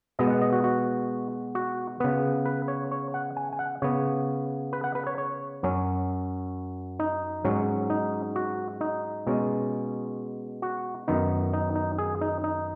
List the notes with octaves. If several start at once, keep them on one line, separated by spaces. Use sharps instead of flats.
B2 G#3 B3 D#5
F#5
D#5
F#4
F#4
F#4
C#3 B3 B4
B4
C#5
C#5
F#5
G#5
G#5
F#5
C#3 B3 C#5
B4
F#5
B4
C#5
C#5
F#2 F#3 C#4
D#4
G#2 F#3 C#4
D#4
F#4
D#4
B2 G#3 C#4
F#4
F#2 D#3 B3 D#4
D#4
D#4
G#4
D#4
D#4